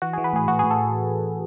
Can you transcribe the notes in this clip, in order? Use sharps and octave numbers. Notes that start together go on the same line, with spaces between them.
E3 F#4
E3 G#4
B4
A2 G#4
A2 F#4
A2 G#4
A4